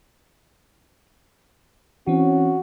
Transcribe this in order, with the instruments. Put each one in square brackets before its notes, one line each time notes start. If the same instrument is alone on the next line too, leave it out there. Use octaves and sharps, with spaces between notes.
[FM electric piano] E3 C4 [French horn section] C#4 [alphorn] F#4